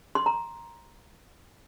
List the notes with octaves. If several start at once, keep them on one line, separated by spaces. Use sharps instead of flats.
C6
A#5